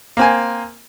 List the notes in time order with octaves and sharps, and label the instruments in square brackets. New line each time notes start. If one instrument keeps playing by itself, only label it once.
[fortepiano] A#3 C4 G#5